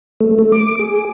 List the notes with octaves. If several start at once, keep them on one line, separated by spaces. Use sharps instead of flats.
A3
A3
D6
G#4